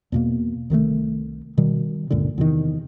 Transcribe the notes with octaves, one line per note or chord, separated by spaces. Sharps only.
E2 B2 A#3
C2 D#3 E3 A3
B2 D#3 G3
C#2 G2 A#2 D3
E2 C3 D#3